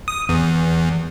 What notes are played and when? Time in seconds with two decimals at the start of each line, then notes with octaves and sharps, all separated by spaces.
0.08 D#6
0.29 E2